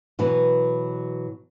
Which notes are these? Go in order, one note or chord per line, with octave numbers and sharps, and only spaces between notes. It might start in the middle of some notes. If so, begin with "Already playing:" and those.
B2 E3 F#3 B4